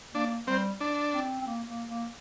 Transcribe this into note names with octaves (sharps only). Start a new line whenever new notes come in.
A#3 D4
G3 C4
D4
C4
C4
A#3
A#3
A#3